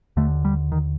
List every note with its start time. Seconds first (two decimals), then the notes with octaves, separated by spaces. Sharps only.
0.17 D#2 D3 A3
0.45 G3
0.72 D#3